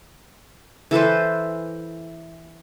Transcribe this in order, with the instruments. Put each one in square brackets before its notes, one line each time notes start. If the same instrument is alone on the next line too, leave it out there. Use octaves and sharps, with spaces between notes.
[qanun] E3 A4 B4 C5